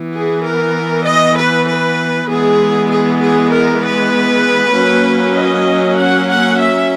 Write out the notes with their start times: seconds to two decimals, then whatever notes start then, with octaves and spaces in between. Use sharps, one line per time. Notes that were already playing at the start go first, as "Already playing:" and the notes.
Already playing: E3 B3
0.15 G#4
0.45 A#4
1.07 D#5
1.37 B4
1.68 B4
2.29 E3 G#3 B3 G#4
2.90 G#4
3.22 G#4
3.52 A#4
3.83 B4
4.75 F#3 A#3 C#4
5.36 D#5
5.98 F#5
6.29 F#5
6.60 E5